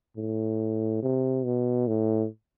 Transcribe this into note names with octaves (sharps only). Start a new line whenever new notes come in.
A2
C3
B2
A2